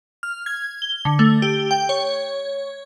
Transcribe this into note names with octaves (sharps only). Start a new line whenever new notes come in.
F6
G#6
G7
D3
A3
G4
G5
C#5